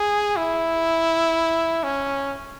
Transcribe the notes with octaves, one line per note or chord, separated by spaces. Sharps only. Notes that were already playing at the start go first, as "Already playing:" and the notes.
Already playing: G#4
E4
C#4